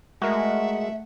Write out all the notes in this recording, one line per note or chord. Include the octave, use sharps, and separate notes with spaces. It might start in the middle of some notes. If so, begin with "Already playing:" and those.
G#3 A3 F#4 A#4 E5 F#5